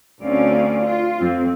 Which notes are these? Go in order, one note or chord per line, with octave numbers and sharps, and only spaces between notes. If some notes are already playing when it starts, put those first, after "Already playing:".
D2 C4 C#4 D5 F5
F4
F2 C4